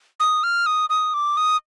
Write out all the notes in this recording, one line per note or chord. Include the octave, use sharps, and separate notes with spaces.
D#6
F6
D#6
D#6
D6
D#6